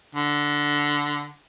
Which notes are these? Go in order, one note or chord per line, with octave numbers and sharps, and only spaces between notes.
D3